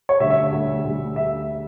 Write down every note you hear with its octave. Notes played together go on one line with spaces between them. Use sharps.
C#5
D2 D3 G3 E5
E5
D2 D3 G3
D2 D3 G3
D3 G3 E5